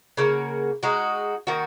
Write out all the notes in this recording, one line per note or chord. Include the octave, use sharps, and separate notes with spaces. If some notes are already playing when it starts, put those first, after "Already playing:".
C#3 A#3 F#4
G#3 D#4 F#4
D#3 A#3 F#4